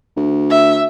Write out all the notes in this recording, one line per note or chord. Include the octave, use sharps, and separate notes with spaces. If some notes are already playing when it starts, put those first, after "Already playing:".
D2
E5